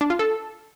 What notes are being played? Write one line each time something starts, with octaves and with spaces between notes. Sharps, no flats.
D4
F4
A4